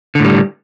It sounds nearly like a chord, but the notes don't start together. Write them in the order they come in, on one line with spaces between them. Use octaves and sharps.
D3 A2 G3